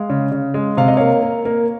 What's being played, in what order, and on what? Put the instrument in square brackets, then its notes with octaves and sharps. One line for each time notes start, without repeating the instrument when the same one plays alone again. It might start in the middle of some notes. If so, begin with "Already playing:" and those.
Already playing: [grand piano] G#3 F5
C#3
C#3
G#3
C3 F5
D#5
A#3 C#5 F5
A#3
A#3